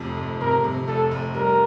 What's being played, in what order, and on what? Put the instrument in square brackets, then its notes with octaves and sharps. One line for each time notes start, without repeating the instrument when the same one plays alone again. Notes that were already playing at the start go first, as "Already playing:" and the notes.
Already playing: [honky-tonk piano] F1 F2 C3
F1
[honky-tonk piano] C3 [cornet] A#4
[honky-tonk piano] C3
[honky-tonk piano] F1 [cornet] A4
[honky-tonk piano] F1
[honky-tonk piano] G3 [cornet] A#4